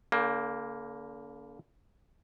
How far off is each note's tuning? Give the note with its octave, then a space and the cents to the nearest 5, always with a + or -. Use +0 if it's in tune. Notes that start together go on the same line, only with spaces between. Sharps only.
D3 -45 A#3 +0 G5 +25